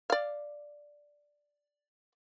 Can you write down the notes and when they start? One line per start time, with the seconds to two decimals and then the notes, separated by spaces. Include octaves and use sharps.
0.10 D5 F5